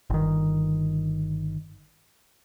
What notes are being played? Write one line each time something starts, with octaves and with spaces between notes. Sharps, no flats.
G1 D#3